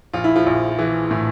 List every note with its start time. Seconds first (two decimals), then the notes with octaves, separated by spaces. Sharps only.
0.13 A#1 F4
0.24 E4
0.36 F3 F4
0.46 A#1
0.79 E3
1.11 A2